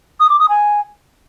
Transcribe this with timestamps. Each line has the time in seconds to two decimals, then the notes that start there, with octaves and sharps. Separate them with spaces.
0.20 D#6
0.30 D6
0.39 D#6
0.49 G#5